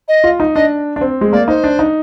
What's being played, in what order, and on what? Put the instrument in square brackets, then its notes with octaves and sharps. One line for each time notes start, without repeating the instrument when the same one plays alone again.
[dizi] D#5
[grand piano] F4
D#4
[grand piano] D4 [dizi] D#5
[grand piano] D4
C4
G#3
[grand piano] A#3 [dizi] D5
[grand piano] D#4 [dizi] C5
[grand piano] D4
D#4